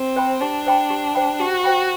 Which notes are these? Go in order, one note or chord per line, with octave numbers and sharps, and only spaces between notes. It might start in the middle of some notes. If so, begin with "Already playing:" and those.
Already playing: C4
C5 G5 B5
D4 G4
C5 G5 B5
G4
C5 G5 B5
F#4 G4
C5 G5 B5